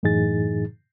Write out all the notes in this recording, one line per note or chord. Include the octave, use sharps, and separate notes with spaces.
F#2 A2 E3 D#4 G#4 A6